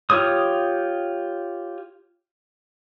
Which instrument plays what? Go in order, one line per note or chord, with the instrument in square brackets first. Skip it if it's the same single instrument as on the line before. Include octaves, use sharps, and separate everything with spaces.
[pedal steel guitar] F4 G4 C#5 D#6